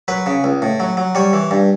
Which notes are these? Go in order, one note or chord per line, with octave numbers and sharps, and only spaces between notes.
F#3 B4
C#3
C#2
A2
F#3
F#3
G3 C#5
E3
G2